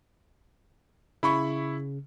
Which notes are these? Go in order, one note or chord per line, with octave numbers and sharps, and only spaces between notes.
C#3 E4 B5 C#6